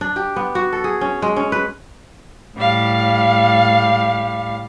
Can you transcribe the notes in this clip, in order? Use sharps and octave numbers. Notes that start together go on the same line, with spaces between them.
D4
G4
B3
F#4
A4
G#4
C#4
G#3
C#4
B4
A2 G3 F5